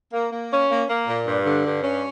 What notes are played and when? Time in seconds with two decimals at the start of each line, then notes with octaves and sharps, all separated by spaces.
0.11 A#3
0.31 A#3
0.50 C#4
0.69 A#3
0.88 A#3
1.07 A#2
1.25 G2
1.44 D3
1.64 G2
1.83 C#4